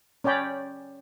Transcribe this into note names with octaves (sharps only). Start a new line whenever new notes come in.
C#4 C#5 D5 G5 B5